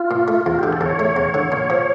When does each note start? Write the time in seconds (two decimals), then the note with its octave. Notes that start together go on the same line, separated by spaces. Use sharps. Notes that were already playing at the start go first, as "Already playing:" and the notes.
Already playing: F4
0.11 A#2
0.28 A3
0.46 E2 F4
0.59 D3 G4
0.73 A4
0.81 E2 C#5
0.99 A3
1.16 E2
1.34 D3
1.52 A#2
1.70 F3